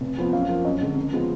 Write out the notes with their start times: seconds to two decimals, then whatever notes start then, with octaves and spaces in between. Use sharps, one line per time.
0.01 F1
0.17 F2 F3 B3
0.33 F#2 F5
0.49 F3 A#3
0.65 F#2 D#5
0.81 D3 G#3
0.96 F#1
1.13 F3 G#3 B3